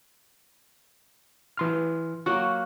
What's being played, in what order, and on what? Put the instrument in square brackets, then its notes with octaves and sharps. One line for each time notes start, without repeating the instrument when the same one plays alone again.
[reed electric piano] E3 C6 F6
[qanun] F#3 A#3 [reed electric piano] C#6 F#6